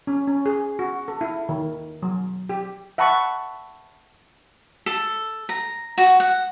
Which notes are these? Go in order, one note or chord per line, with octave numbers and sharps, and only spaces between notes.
C#4
C#4
G#4
F#4
A4
E4
D#3
F#3
G4
E5 F#5 A5 B5 C#6
A4
A#5
F#4
F#5